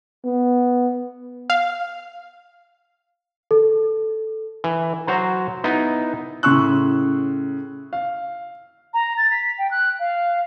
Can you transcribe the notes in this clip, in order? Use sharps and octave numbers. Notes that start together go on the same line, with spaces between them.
B3
F5
A4
E3
F#3 F#4 C5 A#5
B3 D#4 E4
A2 C#3 C6 C#6 E6 F#6
F5
A#5
A6
B6
G5
F#6
F5